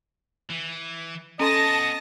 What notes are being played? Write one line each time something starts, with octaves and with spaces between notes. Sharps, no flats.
E3
B3 C#4 A4 D#5 G#5 A5 C6 A#6